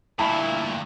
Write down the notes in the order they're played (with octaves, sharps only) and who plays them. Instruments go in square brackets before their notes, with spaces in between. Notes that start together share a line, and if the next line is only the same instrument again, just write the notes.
[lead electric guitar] D2 G2 [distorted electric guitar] A#2 [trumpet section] E4 [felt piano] A5 B5